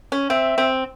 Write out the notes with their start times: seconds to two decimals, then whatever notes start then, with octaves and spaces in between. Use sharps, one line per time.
0.12 C#4
0.30 C4 E5
0.58 C4